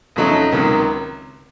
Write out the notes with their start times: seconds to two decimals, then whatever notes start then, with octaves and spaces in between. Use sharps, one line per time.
0.16 F2 C#3 F#3 A3 D#4
0.52 C#2 C3 D#3 F#3